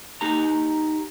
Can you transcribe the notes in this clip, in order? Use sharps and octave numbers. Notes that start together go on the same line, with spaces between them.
D#4 G4 A#5